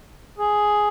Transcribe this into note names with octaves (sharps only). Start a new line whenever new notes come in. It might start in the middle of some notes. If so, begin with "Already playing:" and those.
G#4